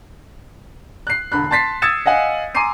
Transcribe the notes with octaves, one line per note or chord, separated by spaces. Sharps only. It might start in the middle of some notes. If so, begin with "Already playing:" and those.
F#6 C7
E1 D3 B5 F#6
A5 C6 A6 B6 C7
D#6 E6 G#6 A6 C#7 E7
D#5 F5 F#5 G#5
G#5 A#5 C6 D6 C7 D#7